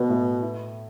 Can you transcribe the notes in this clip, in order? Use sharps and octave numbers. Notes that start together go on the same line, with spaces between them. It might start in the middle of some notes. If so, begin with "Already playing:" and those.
Already playing: B2 B3
A2
E4